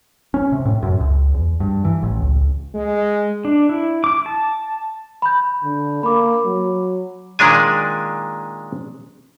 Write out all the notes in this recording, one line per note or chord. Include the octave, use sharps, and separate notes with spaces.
C#4
C3
A2
F#2
C#2
E2
G2
E3
A1
C#2
G#3
D4
E4
D6
A5
B5 G6
D3
A#3 B5 D6
F#3
A#2 D#3 G#3 D4 G#5